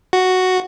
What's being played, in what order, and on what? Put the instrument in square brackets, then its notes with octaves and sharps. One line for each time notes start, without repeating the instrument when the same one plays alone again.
[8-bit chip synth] F#4